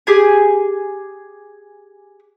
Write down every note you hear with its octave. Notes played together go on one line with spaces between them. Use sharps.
G4 G#4 G#5